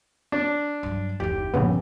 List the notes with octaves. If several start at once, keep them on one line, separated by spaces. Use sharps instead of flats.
D4
G2 F#3
F#1 D#2 G4
A#1 G2 C#3 F3 B3